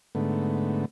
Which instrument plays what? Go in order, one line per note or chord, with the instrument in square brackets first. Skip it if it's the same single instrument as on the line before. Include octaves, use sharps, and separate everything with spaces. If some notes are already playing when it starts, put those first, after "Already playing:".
[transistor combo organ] G#2 D3 A3 B3